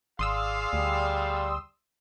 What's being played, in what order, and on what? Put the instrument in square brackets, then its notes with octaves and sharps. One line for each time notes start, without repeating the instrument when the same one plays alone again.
[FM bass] G#1 [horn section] G#4 D5 F5 [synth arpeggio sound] C6 D#6 E6
[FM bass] D2 [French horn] G3